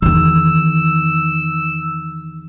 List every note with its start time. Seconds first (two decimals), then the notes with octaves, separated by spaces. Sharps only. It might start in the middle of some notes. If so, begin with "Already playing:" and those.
0.02 E2 D#3 E6